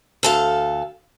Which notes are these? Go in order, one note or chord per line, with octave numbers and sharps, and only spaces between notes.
D2 A4 F5